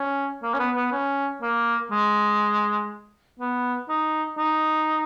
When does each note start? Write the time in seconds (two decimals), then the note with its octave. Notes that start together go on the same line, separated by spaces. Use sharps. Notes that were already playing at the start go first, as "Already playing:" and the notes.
Already playing: C#4
0.42 A#3
0.54 C#4
0.59 B3
0.76 B3
0.92 C#4
1.42 A#3
1.91 G#3
3.39 B3
3.89 D#4
4.38 D#4